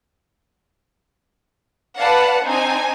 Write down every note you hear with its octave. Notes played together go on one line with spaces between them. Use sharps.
B4 D5 F5 F#5 A5
C4 D4 D#4 G#5